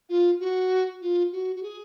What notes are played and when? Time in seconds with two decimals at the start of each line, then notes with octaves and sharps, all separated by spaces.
0.09 F4
0.40 F#4
1.02 F4
1.33 F#4
1.56 F#4
1.63 G#4